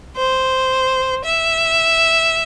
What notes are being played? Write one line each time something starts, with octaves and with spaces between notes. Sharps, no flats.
C5
E5